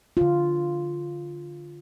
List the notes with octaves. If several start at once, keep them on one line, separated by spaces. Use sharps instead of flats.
D3 F4